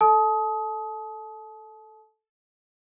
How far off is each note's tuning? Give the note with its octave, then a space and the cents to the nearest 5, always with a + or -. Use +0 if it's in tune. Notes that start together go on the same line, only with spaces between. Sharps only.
A4 +0 A5 -35 D#6 +20